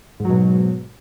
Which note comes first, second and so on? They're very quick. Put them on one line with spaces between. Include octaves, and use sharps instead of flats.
G#2 F#3 B2